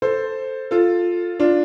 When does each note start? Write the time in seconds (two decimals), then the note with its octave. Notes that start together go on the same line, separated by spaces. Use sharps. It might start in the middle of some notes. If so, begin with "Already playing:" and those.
0.02 A4 C5
0.71 F4 A4
1.40 D4 F4